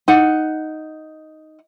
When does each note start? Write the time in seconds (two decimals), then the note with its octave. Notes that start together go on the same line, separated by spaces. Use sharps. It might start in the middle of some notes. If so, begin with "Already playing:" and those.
0.08 D#4 F#5